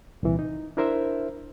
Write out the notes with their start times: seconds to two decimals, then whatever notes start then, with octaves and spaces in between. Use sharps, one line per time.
0.23 C2 A#2 E3
0.39 D#4
0.77 D4 E4 A#4 C5 E5